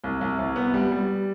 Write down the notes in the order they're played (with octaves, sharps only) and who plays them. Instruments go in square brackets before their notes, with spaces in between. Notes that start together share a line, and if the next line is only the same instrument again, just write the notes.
[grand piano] C2
C2
C2
B3
G3
G3